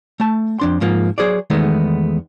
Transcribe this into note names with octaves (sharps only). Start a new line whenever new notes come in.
A3 A5
F2 D4 C6
G#2 F3 A#3
F#3 G#4 C5 D5
E2 D#3 G#3 A3 B3